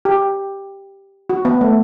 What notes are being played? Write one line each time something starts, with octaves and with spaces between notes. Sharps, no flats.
G4
F#4
B3
A3